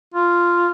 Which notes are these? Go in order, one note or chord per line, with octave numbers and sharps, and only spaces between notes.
F4